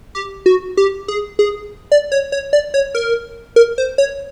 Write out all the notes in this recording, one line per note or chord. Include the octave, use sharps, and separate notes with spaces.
G4
F#4
G4
G#4
G#4
D5
C#5
C#5
D5
C#5
A#4
A#4
C5
C#5